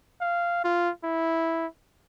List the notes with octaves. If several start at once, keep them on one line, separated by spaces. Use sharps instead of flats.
F5
F4
E4